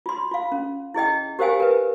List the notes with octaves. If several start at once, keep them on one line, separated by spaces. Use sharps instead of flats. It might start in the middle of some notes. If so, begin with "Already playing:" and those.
F4 C6
F4 F5
C#4
E4 G#4 D#5 G5
G4 A#4 C5 F5 G5 G#5
A#4 B4